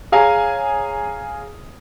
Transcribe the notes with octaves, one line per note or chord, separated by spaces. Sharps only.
G#4 C#5 F5 G#5 A#5